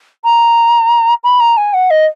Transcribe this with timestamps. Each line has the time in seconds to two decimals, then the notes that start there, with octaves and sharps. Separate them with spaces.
0.24 A#5
1.24 B5
1.40 A#5
1.57 G#5
1.74 F#5
1.90 D#5